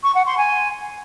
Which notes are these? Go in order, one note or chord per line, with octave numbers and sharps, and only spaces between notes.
C#6
F#5
C6
G#5